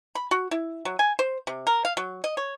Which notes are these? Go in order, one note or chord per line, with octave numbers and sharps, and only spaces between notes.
B5
F#4
E4
F#3
G#5
C5
C3
A#4
F5
F#3
D#5
C#5